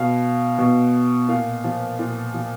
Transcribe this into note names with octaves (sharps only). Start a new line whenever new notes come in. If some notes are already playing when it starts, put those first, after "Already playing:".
Already playing: B2 F5
B2
A#2 F5
F3
A#2
F3